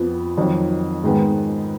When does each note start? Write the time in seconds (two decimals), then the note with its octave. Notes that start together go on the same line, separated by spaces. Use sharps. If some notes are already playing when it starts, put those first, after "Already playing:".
Already playing: F2 F3 B3
0.38 F2 D#3 F#3
1.03 G#2 D#3 G#3 B3